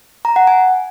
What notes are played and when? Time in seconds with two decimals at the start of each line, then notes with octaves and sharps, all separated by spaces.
0.25 A#5
0.36 F#5
0.47 G#5